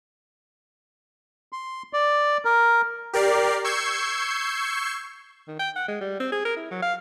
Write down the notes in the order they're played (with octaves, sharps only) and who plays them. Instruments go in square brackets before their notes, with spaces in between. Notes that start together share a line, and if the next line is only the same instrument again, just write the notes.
[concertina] C6
D5
A#4
[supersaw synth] G4 A#4 D5 C7
C#6 E6 G6 G#6 C7 C#7
[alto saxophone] D#3
G5
F#5
G#3
G3
C4
G#4
A#4
E4
F#3
F5